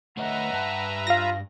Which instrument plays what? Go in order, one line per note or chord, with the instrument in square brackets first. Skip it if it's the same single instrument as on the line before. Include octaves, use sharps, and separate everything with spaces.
[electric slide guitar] A3 C#5 D#5 [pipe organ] B4 E5 A#5 [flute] F#5
[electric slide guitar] G2 A5
[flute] F4 [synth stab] F5 A#6